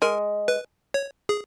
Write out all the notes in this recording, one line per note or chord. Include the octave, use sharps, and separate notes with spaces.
G#3 A#4
B4
C#5
G#4